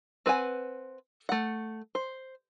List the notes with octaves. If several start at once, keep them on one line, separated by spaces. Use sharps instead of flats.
C4 B4 F#5 G#5
A3 F#5
C5